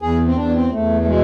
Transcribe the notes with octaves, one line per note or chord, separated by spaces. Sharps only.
E2 G#4
C4
E2 D4
C4
E2 A3
A3
B2 G#3